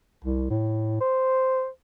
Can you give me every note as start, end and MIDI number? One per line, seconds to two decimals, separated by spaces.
0.24 0.46 36
0.50 0.97 45
1.00 1.68 72